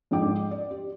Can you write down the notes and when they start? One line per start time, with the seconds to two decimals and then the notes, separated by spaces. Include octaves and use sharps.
0.11 F2 G#2 F3 G5 D6
0.51 D5
0.71 G4